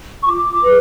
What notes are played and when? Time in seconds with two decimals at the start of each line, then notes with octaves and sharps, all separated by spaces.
0.23 C#6
0.27 F4 D6
0.62 G#4 B4